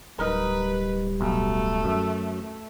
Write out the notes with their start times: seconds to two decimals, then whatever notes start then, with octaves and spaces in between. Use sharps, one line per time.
0.19 D1 G3 D#4 A#4 B4
1.21 B1 A3
1.84 F#2 E5